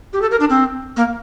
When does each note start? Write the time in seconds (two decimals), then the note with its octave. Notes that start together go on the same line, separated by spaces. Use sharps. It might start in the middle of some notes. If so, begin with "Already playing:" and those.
0.13 G4
0.22 A4
0.31 A#4
0.40 D4
0.50 C4
0.97 A#3